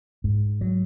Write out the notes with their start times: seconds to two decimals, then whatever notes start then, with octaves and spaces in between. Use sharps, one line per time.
0.24 G#2
0.61 F#3